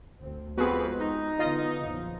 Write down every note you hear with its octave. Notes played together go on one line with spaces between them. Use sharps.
D2 C4
F2 G#3 B3 C4 F#4 G#4 B4
D#4
D3 E3 B3 F4 D#5
A#1 F#2 F3